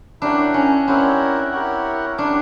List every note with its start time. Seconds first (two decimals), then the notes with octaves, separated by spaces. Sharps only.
0.21 D4 E4 G4 A#4 C#5 F#5
0.54 C#4
0.87 C4 E4 G4 A#4 C#5 F#5
1.52 E4 G4 A#4 C#5 F#5
2.18 D4 E4 G4 A#4 C#5 F#5